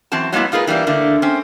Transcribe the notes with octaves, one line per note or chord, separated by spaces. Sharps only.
F#2 E3 C4 F#4 A5
F#3 G#3 A#3 B3 E4
D#4 F4 G#4 A#4 B4
E3 G3 A#3 D4
D3 A3 A#3
C4 C#4